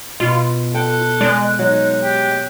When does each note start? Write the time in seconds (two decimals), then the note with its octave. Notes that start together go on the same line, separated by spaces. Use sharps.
0.20 B2 F4
0.75 A4 G5 F#6
1.21 G#3 D5
1.59 F#3 D#4
2.00 G4